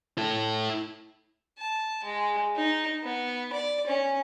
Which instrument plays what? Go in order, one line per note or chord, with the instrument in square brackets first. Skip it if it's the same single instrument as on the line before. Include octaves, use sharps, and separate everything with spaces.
[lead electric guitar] E4 A4
[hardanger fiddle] A5
G#3
D#4
B3
D5
C#4